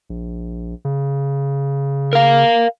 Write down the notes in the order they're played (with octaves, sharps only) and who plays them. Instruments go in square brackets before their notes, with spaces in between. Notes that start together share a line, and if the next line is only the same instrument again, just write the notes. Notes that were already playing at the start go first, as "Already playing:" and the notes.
[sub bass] A#1
C#3
[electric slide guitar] A#4 F5